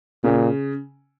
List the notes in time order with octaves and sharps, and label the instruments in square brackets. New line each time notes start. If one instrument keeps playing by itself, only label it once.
[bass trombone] A#2 [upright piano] C#3